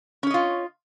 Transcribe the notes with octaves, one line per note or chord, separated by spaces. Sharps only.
C#4 F4 C#5 D#5